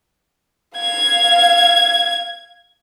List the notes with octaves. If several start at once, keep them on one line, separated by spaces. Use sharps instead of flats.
F5 G#6